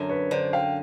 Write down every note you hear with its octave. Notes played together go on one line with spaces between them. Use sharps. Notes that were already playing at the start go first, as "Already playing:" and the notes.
Already playing: F#2 D3
B4 C#5
D3 C5 D5
F5 G5